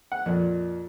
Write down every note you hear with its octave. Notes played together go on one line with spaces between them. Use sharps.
F#5
F2 A#2